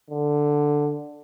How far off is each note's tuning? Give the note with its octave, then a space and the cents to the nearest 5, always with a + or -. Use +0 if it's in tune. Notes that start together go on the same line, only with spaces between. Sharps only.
D3 +5